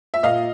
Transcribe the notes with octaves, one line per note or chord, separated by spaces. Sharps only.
E5
A#2 D#5 F5